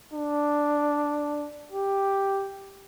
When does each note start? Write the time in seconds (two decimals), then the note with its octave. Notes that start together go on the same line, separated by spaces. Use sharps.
0.13 D4
1.72 G4